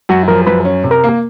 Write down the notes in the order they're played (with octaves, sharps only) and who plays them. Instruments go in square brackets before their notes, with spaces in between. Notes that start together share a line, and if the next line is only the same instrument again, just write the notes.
[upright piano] F#2 [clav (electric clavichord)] F#4
[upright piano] F3 [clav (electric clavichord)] A#4
[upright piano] F#2 [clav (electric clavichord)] B4
[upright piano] C#4
C3
[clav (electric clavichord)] A#4
[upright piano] A#3